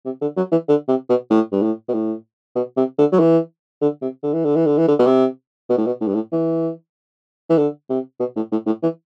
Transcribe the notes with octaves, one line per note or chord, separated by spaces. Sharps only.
C3
D3
F#3
E3
D3
C3
B2
A2
G2
A2
B2
A2
B2
C3
D3
F#3
E3
D3
C3
D3
E3
D3
E3
D3
E3
D3
B2
C3
B2
A2
B2
A2
G2
A2
E3
E3
D3
C3
B2
A2
A2
A2
E3